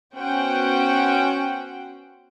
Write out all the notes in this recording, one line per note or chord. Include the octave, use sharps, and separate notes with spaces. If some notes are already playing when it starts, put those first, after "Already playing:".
B3 C#4 F#4 C5 F#5 G5